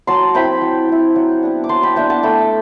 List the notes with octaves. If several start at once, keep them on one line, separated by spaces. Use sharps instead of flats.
F#3 A5 C6
C4 E4 G5 B5
F#3
C4 E4
F#3
B3 D4
D6
F#3 A5 C6
G5 B5
B3 D4 E5 G5
F#5 A5
A3 G5 B5